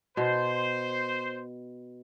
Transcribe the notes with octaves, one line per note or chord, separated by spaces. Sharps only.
B2 C5